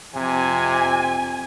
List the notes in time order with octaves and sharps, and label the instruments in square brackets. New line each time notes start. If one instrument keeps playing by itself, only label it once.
[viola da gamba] F2 [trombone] C3 [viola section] G#5